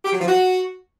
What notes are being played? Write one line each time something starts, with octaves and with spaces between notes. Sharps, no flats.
G4
F#3
F3
F#4